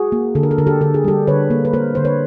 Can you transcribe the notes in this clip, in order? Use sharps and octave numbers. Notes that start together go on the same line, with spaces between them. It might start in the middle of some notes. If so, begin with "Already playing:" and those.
Already playing: F#4 G#4
A#3
D3 A4
A#4
A4
D3 A#4
G4 A4
D3 A4
G#4
G3 G4 A4
D3 B4 C#5
A#3
B4
A#3 A#4 C5
D3 C5
B4 C#5